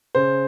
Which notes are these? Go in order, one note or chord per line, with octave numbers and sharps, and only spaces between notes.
C#3 C5